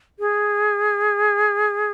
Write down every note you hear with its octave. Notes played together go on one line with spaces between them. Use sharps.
G#4